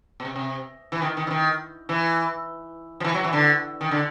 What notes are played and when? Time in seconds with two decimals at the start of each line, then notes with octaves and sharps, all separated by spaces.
0.20 B2
0.25 C3
0.36 C3
0.92 E3
1.02 D#3
1.17 D#3
1.27 E3
1.31 D#3
1.89 E3
3.00 F3
3.04 E3
3.14 F#3
3.24 E3
3.33 D3
3.81 D#3
3.91 D3